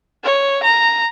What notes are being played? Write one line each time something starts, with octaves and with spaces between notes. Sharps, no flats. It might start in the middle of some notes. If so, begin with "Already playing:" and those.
C#5
A#5